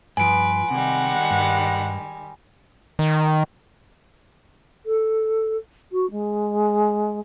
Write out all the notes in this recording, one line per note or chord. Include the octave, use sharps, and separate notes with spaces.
G2 F3 B4 G#5 C6 D7
C3 D#3 G3 G#3 F#5
G2
D#3
A4
F#4
G#3